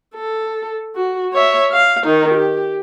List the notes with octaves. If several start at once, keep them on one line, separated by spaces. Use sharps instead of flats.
A4
F#4
C#5 E5
F5
D#3 D#4
G4